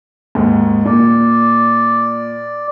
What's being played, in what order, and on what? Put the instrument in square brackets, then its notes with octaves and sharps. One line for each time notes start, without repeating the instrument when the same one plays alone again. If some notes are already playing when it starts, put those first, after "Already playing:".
[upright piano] D#2 G#2
[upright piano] A#2 [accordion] D5